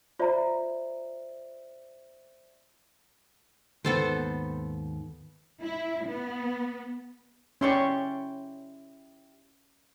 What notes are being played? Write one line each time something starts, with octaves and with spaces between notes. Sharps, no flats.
F4 C5 D5 E5 A#5
D#2 G#2 D#3 B3 A4 C5
E4
B3
C#4 E4 G4 D5 C6 C#6